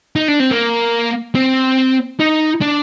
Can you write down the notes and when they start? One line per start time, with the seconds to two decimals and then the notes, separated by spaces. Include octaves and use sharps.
0.16 D#4
0.28 D4
0.40 C4
0.51 A#3
1.35 C4
2.20 D#4
2.61 D4